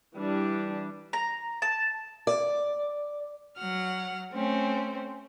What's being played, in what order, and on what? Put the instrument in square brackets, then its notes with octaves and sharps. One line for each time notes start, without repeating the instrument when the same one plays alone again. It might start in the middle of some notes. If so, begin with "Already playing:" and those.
[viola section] E3 G3 D4
[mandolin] A#5
A5
[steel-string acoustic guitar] D5
[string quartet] F#3 F#5 F6
A3 C4 C#4